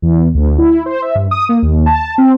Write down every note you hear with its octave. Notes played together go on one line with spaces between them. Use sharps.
E2
D2
E4
C5
E5
G2
D#6
A#3
D#2
A5
C4